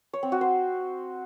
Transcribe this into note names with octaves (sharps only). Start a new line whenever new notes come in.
C#5
C4
F#4
C5